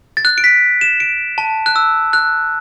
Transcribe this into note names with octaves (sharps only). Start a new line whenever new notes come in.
A6
F#6
D7
B6
E7
D7
A5
F#6
E6
F#6